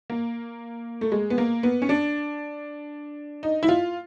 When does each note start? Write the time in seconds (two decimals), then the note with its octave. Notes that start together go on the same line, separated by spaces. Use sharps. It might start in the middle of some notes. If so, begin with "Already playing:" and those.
0.10 A#3
1.01 A3
1.12 G#3
1.30 B3
1.38 A#3
1.63 B3
1.82 C#4
1.89 D4
3.43 D#4
3.63 E4
3.69 F4